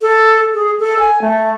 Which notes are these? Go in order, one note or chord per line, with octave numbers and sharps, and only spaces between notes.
A4
G#4
A4
G#5
A3